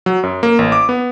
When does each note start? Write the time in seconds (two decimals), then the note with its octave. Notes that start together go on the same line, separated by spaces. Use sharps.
0.06 F#3
0.23 F#2
0.43 A#3
0.59 A1
0.72 D6
0.89 B3